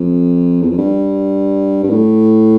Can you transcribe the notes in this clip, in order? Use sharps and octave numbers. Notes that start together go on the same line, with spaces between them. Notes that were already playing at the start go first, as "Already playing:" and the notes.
Already playing: F2
E2
F2
G2
G2
A2